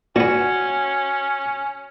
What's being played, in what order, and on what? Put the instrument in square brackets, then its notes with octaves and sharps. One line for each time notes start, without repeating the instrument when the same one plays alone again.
[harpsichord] A#2 B3 [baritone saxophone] C#4 [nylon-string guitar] F#4